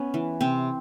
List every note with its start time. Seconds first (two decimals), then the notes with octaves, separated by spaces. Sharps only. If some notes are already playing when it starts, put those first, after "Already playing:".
Already playing: B3 C#4
0.14 E3
0.41 C3 C4